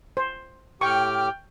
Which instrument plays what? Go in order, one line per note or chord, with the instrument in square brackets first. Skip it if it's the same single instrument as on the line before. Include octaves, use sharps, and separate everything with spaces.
[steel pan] C5
[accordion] A2 G4 D6 [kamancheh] G5 F6 [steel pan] C#6